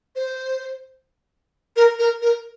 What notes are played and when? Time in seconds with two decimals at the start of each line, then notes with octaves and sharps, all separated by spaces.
0.16 C5
1.76 A#4
1.99 A#4
2.22 A#4